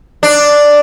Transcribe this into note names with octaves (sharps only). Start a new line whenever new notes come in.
D4